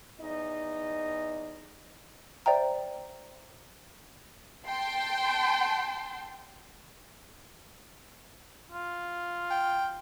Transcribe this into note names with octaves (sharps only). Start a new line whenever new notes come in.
E2 D#4 D#5
C5 D5 E5 G5 A#5
G5 A5 C6
F4
G5